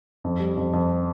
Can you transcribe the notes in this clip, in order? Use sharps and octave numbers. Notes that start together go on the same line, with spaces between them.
F2
G3
F2
F2